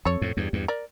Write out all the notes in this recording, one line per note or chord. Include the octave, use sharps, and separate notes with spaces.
F2 A4 C#5
F2 A2
E2 G2
E2 G2
A#4 D5